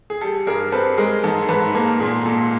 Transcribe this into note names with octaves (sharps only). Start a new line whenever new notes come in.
G#4
G3 A4
G2 G#4 A#4
C4 A4 B4
G#3 G#4 A#4
G#2 A4
G#2 A4 B4
A#3 A4
A#2 G#4
A#2 A4